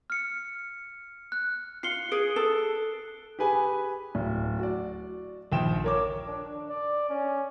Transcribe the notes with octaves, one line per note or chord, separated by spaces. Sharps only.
F6 C#7
F#6
F4 C7 C#7 G7
G#4 D7
A4
G4 G#4 B4 G#5
D1
F#4 D5
A#1 D#2 G5 E7
A#4 C#5 D6
D4
D5
C#4